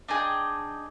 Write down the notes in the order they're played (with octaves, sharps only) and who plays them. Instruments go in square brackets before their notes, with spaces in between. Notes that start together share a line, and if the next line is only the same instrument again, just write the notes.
[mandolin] D4 D#4 G#4 G5